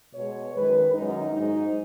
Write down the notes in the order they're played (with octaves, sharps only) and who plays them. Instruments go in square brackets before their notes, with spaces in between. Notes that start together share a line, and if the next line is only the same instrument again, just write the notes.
[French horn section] B2 G#3 C#5
F#2 D#3 G#3 B4
F#2 D#3 G#3 D#4
G#2 F#3 D#4